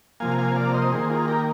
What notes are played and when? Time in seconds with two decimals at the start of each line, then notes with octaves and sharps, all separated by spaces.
0.20 C3 F3 A#3 F5 G#5
0.38 F5 G#5
0.56 D5 F5
0.74 C5 D#5
0.92 D#3 A#3 G#4 C5
1.10 F4 G#4
1.28 G4 A#4